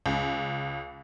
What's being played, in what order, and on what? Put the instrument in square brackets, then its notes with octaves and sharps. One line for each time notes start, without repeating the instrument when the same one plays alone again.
[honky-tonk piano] C#2